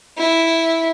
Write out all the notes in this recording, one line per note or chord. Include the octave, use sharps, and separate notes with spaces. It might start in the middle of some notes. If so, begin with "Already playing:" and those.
E4